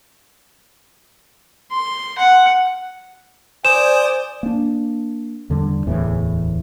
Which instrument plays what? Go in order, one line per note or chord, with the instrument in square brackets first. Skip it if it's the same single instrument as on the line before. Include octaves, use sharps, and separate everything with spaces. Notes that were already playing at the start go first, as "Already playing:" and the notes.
[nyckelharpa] C6
F#5
[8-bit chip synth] C5 D#6 [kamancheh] D5 G#5 [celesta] E7
[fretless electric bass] A#3 D4
E2 D3 G3 D4
D1 E2 A2 E3